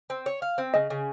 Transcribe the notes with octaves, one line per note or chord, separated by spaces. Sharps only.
C4
C#5
F5
C4
C#3 D#5
C#3